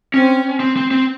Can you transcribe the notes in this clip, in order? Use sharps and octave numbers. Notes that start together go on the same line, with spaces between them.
C4 C#4
C4
C4
C4